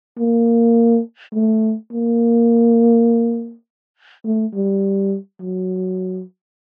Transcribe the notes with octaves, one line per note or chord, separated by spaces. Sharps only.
A#3
A3
A#3
A3
G3
F#3